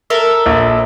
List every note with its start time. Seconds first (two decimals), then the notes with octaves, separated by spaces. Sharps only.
0.10 A4 A#4 E5
0.46 A#1